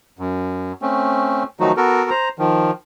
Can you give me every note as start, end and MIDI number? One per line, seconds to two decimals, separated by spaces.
0.19 0.72 42
0.82 1.43 57
0.82 1.43 60
0.82 1.43 61
1.60 1.72 51
1.60 1.72 53
1.60 1.72 54
1.60 1.72 57
1.60 1.72 63
1.60 1.72 66
1.77 2.10 59
1.77 2.10 66
1.77 2.10 69
1.77 2.10 70
2.10 2.29 72
2.10 2.29 82
2.39 2.71 51
2.39 2.71 53